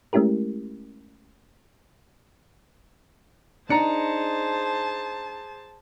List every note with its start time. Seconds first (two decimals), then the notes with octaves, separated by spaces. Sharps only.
0.13 G#3 A3 C#4 E4 G4 A#4
3.70 D4 D#4 G#4 C5 A5 A#5 C#7